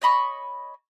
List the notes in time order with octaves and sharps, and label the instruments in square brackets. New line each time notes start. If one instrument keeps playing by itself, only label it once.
[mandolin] C#5 D#5 B5 C#6